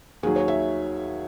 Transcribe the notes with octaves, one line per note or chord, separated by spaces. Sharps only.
D#2 D#3 F#3 G#4
C#5
E5